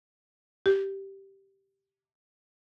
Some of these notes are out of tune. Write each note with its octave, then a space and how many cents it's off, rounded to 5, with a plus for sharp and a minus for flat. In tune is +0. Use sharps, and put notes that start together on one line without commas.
G4 -10